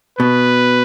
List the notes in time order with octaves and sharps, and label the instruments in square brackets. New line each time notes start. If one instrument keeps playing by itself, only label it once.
[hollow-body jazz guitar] B2 [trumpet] B4